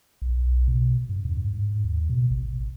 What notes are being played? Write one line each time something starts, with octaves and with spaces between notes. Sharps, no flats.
B1
B2
G2
E2
G#2
D#2
B2
A1